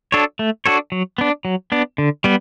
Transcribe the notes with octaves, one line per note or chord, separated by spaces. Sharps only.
D4 F#4 A4 C#5
A3
D4 F#4 A4 C#5
F#3
B3 D4
F#3
B3 D4
D3
G3 B3